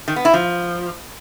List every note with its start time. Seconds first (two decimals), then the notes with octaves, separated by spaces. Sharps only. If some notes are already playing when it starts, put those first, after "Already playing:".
0.08 D#3
0.16 B3
0.25 E4
0.34 F3